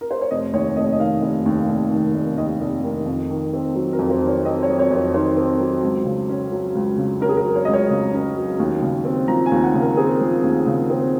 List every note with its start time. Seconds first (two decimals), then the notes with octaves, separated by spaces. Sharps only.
0.01 A#4
0.11 C5
0.21 C#5
0.31 F1 D#5
0.53 D#2 C#5
0.76 F1 D#5
0.84 C#5
0.92 D#5
1.00 D#3 F5
1.22 F1
1.46 D#2
1.69 F1
1.92 D#3
2.15 F1
2.38 D#2 D#5
2.61 F1
2.83 D#3
3.06 F2
3.30 D#3
3.53 C4
3.75 F#3
3.93 A#4
3.99 F2
4.10 C5
4.22 D#3
4.28 C#5
4.45 C4 D#5
4.63 C#5
4.68 F#3
4.79 C#5
4.91 F2
4.97 C5
5.14 D#3 C5
5.37 C4
5.60 F#3
5.83 C#2
6.05 C#3
6.29 C#4
6.52 F#3
6.75 C#2
6.98 C#3
7.21 C#4 A#4
7.29 G#4
7.37 A#4
7.45 F#3
7.56 C#5
7.65 C#2 D#5
7.73 C#5
7.90 C#3
8.14 C#4
8.37 F#3
8.59 D#2
8.82 C#3
9.05 C4
9.28 F3 A#5
9.46 G#5
9.51 D#2
9.62 F#5
9.75 C#3
9.81 A#4
9.97 C4 G#4
10.21 F3
10.43 D#2
10.67 C#3
10.90 C4